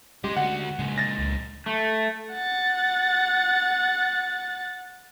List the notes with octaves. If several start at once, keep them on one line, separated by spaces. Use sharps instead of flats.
G#3 C#4 G4 D#5 C6
D2 F#4 F#5
A#2 C#3 G#3
A6 A#6
C#2
A3
F#5 A6